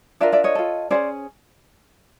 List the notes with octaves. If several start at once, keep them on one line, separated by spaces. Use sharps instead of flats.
D4 F4 A#4 D5 E5
D5 E5
C#5 D#5
F4 A4
C#4 E4 G#4 C5 D5